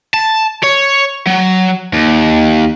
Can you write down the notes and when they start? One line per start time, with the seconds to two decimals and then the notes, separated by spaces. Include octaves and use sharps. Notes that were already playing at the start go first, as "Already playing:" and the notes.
0.14 A5
0.64 C#5
1.27 F#3
1.94 D#2